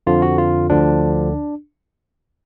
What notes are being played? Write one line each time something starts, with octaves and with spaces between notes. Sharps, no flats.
F2 D3 F3 F4
F#4
F4
D2 D3 F3 D4